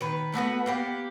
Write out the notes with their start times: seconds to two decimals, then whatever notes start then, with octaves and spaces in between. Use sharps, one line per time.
0.01 D#3 B4
0.34 A3 B3 F#4 B4
0.66 A#3 B3 G4